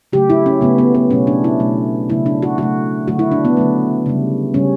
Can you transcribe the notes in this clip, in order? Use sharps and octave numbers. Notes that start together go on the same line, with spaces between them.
C#3 F#3 A3 G4
E4
C#4
C#3 F#3 A3 B3
B3
B3
B2 F#3 A3 C#4
D4
E4
B2 F#3 A3
C#3 F#3 A3 E4
D4
F#4
C#3 F#3 A3 F#4
D3 F#3 A3 F#4
E4
D4
B3
D3 F#3 A3
C#3 G3
C#3 G3 C#4